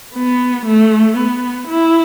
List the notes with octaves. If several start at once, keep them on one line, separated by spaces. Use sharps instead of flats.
B3
A3
B3
E4